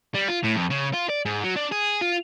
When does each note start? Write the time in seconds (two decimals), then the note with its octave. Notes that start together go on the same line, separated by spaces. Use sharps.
0.14 G3
0.28 F4
0.43 A2
0.56 F2
0.70 C#3
0.93 F4
1.09 D5
1.26 G#2
1.44 F#3
1.57 D4
1.72 G#4
2.01 F4